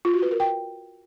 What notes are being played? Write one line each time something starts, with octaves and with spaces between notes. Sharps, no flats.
F4
F#4
B4
A#4
G5